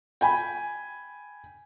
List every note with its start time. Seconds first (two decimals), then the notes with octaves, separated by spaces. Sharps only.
0.21 G5 G#5 B5